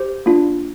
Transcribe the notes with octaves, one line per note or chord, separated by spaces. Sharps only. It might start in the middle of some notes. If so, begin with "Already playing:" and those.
Already playing: G4 C5
A#3 D4 F4